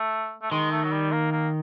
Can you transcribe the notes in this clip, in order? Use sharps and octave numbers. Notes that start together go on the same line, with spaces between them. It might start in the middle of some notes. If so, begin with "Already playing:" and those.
Already playing: A3
A3
D#3 G#3
A3
F#3
G3
A#3
A#3